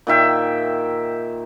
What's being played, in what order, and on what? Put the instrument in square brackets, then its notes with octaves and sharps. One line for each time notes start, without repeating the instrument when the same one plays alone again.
[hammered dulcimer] A#2 D#3 E5 G5